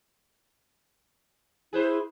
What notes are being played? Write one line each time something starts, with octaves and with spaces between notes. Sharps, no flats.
E4 G#4 B4 C5